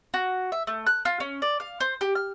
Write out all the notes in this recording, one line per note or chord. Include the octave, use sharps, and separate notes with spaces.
F#4
E5
A3
F#6
F4
C#4
D5
F5
C5
G4
F6